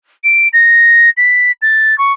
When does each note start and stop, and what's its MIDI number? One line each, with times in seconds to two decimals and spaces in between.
0.24 0.48 98
0.53 1.10 94
1.17 1.52 95
1.62 1.98 93
1.98 2.13 85